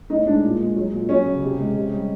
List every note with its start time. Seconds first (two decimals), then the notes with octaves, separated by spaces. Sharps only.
0.10 A2 D#4
0.26 G#3 D4
0.43 A#2
0.60 G#3
0.76 F#3
0.92 A#2
1.09 F#3 C#4
1.25 C#3
1.43 C3
1.59 G#3
1.76 C3
1.92 G3